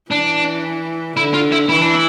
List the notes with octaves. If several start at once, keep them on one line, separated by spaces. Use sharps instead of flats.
E3 D4
D3 E4
F4
E4
E3 E4
D4
E4